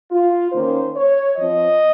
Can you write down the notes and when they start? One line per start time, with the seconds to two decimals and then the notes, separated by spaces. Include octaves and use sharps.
0.11 F4
0.52 D#3 A#3 C#4 C5
0.95 C#5
1.37 F3 C4 D#5